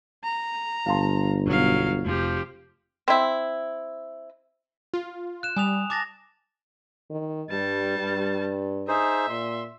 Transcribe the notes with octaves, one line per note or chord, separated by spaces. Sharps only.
A#5
G1 F5 A5 C6
B1 F#3 F5
F1 F3 G4
C4 E4
F4
F#6 E7
G3 G#5 D#6 F7
A5 D6 A6 A#6
D#3
G2 G3 A5
G2
D#4 G#4 C5 E5
A#2 C6